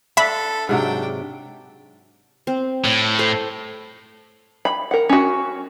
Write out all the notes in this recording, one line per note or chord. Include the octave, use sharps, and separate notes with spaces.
D4 A4 E5 B5
G#2 C3 F#3 D4 G5
C4
A2 C#5
A4 C5
B5
A#4 F#5
C#4 F#4